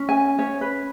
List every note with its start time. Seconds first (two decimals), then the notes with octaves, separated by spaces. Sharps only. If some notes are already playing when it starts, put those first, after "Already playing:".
Already playing: C#4
0.09 G#5
0.39 C#4 C#5
0.61 B4